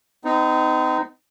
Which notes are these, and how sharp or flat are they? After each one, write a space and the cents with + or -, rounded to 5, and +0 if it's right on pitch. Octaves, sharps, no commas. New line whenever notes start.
C4 -45 D#4 +0